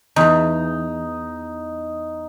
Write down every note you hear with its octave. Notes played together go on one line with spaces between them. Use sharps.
E2 E3 D#4